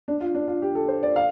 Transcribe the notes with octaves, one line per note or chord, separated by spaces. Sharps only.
D4
F4
D4
F4
G4
A4
C5
D5
F5